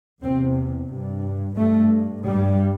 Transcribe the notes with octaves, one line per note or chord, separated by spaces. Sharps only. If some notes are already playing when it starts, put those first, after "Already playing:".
E2 C3 C4
G2
G2 A3
G2 G3